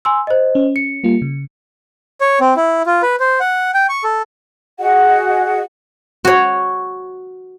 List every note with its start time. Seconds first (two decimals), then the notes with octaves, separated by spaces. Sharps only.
0.05 G#5 C6 E6
0.27 C5 D#5
0.55 C#4
0.76 C#7
1.04 G3 A#3 F4
1.22 C#3
2.21 C#5
2.41 C4
2.57 E4
2.86 F4
3.02 B4
3.20 C5
3.40 F#5
3.74 G5
3.89 C#6
4.04 A4
4.79 F#4 G#4 D#5 F#5
6.25 F#4 C#5